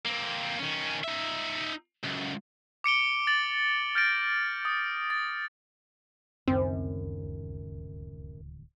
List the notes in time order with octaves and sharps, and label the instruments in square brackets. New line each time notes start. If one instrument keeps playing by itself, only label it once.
[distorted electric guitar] A#3 C4
D#3 C#4
D#4 E5
C#2 F#2
[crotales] D6 C#7 D7 G7
A6 F#7
F6 G6 A6 A#6 D7
D#6
A6
[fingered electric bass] D1 C#2 D#3 [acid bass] F#2 [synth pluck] C4